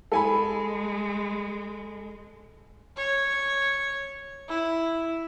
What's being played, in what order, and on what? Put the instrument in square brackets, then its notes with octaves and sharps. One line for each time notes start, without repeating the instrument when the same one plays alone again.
[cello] G#3 [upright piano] A4 G#5 B5
[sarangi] C#5
E4